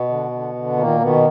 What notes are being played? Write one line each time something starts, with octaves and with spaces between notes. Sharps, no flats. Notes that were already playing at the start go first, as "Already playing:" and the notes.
Already playing: B2 B3
D3
D3
D3
A#2 D#3 A#3
B2 D#3 B3